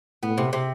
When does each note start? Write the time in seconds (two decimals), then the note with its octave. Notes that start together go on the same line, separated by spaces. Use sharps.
0.23 A2 B3
0.38 C3
0.53 C3